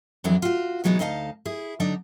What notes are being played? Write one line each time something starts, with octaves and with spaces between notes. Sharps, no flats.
F2 E3 F#3 G#3 D4 E4
F4 F#4
B2 E3 F#3 G#3 B3 D#4
D2 D#4 D#5 F5 G#5 A5
E4 G#4
D3 F#3 D4 D#4